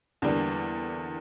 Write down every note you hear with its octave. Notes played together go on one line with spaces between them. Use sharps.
E2 D3 G3 A#3 D4